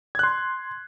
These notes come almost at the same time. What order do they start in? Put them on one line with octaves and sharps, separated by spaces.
G#6 F#6 C6